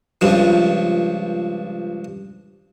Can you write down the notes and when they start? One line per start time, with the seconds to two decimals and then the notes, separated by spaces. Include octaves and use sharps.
0.21 C#2 G2 F3